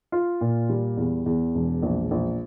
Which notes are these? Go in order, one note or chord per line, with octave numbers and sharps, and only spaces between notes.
F4
A#2
G3
E2
E2
E1
A#1
A#1